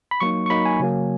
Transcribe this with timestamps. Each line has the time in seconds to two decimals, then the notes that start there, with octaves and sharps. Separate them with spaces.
0.11 B5
0.20 F#3 A#3 D#4 C#6
0.46 C#6
0.50 F#3 A#3 D#4 B5
0.66 G#5
0.80 C#3 F#3 A#3